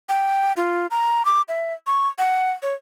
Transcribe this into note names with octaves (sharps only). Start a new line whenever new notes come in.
G5
F4
A#5
D6
E5
C#6
F#5
C#5